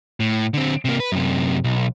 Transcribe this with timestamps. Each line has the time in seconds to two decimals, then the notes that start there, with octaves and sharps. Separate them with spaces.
0.20 A2
0.54 D3 C4
0.85 C3 A#3
1.00 B4
1.12 F#2 C3
1.64 B1